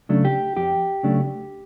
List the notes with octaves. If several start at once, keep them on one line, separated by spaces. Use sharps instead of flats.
C#3 F#3 A3 D4
G4
F2 G4
C#3 F#3 A3 D4